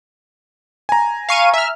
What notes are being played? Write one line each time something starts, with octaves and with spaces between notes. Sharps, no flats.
G#5 A#5
F5 C#6 D#7
E5 F6